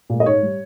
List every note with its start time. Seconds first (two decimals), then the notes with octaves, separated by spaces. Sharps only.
0.10 A#2 G#3
0.20 D#5
0.25 G#2 C#5
0.43 G3